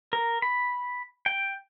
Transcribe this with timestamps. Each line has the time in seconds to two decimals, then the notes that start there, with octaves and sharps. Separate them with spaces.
0.13 A#4
0.42 B5
1.26 G5